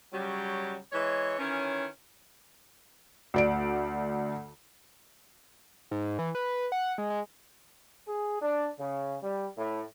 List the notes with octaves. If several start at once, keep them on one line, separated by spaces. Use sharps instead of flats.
C#3 F#3 G3
E3 G#3 C#5
D#3 E3 C#4
D2 D5 D7
G#2
E3
B4
F#5
G#3
G#3
G#4
D4
C#3
G3
A2